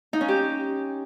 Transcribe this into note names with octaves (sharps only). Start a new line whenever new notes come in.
D#4
C#4
G4